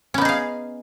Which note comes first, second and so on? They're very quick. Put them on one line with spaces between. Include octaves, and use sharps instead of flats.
C#4 B3 D#4 G#4 F5